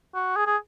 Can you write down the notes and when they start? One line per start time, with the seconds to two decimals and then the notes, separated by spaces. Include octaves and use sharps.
0.15 F#4
0.36 G#4
0.47 G#4